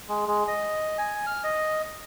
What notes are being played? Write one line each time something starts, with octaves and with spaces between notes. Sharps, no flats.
G#3
G#3
D#5
G#5
F6
D#5